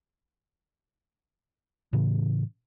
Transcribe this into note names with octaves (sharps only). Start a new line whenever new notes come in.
A2 C#3 E3